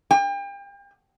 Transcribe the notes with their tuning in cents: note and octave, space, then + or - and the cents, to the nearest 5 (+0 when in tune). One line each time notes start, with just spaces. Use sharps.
G5 +35